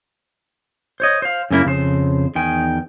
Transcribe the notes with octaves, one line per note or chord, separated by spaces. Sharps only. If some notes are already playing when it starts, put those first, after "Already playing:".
C5 C#5 D#5
C5 F5
F#2 C#3 A#3 E4
F2 C#3 C5
E2 D#3 G5 G#5